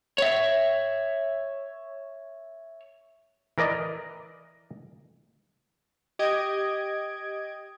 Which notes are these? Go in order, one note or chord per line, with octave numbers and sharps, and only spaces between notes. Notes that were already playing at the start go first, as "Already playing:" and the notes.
C#5 E5
E3 A#4 D5 D#5
G4 D#5 G#6 D7